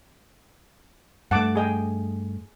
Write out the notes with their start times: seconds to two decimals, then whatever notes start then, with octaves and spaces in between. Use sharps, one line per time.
1.31 G2 A3 F#5 A5 D6
1.55 G#4 D#5 G5